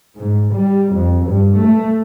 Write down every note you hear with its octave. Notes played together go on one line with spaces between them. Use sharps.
G#2
G3
F2
G2
A3